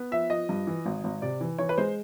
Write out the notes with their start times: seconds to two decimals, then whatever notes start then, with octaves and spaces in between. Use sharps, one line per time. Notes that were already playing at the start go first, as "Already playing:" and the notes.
Already playing: B3
0.11 F3 E5
0.30 F3 D#5
0.49 G2
0.67 E3
0.86 G#1
1.04 G#1
1.22 C3 D5
1.41 E3
1.58 E3 C#5
1.69 B4
1.78 G#3 C5